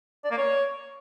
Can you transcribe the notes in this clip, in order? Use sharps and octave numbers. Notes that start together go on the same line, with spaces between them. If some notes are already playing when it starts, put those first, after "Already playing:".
D5
A#3
C#5